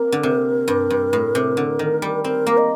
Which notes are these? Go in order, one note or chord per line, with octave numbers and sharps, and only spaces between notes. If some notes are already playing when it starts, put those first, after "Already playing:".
Already playing: A#3 C4 A#4
D3
C3
G2
G2
A2
C3
D3
D#3
G3
C4 A#4
A#3
D#5